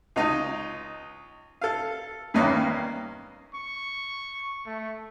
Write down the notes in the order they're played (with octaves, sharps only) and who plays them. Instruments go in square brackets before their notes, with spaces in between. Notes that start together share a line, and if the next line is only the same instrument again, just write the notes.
[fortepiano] C#2 D#4
A4 F5
E2 G2 D#3 A#3 C#4 D#4
[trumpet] C#6
A3